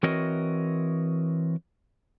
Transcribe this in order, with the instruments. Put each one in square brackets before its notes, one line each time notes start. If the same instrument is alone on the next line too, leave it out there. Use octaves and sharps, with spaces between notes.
[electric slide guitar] E3 C4 F#4 A#4 C#5 D#5